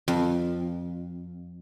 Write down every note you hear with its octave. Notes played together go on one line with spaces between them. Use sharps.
F2